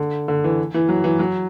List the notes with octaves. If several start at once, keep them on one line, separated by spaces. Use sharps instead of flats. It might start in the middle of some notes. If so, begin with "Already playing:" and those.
Already playing: D3
D3
E3
E3
F#3
E3
F#3